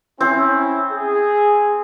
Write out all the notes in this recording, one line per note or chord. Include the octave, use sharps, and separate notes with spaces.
C4 C#4 E4
G#4